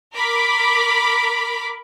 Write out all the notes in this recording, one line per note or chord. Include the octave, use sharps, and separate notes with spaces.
A#4 B5 D6